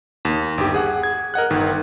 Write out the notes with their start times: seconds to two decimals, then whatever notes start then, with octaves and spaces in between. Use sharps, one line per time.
0.25 D#2
0.58 G1 G4
0.74 G#4 F#5
1.03 G#6
1.34 A#4 D#5 F#5 F#6
1.50 G1 D#3